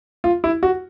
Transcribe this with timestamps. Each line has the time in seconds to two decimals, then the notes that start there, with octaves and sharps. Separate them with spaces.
0.24 F4
0.44 E4
0.63 F#4